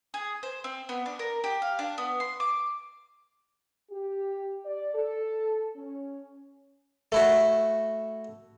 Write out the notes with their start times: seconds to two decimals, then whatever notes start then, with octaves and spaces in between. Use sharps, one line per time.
0.14 G#4
0.43 C5
0.64 C4
0.89 B3
1.06 D4
1.19 A#4
1.44 G4
1.62 F5
1.79 D4
1.98 B3
2.20 C6
2.40 D6
3.90 G4
4.64 D5
4.93 A4
5.75 C#4
7.12 A3 E4 F#4